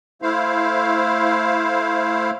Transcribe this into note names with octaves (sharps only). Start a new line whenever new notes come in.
A3 E4 C5 F5